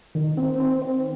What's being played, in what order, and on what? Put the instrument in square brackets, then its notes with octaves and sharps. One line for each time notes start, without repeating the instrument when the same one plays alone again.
[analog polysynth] D#3
C4
C4
C4